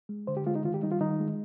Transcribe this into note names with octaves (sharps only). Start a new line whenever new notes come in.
G#3
D3 C5
G4
G#3 F4
D#4
D#3 F4
G4
G3 D#4
F4
D#3 D#4
G#3